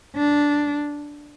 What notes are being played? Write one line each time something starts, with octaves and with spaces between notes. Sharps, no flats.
D4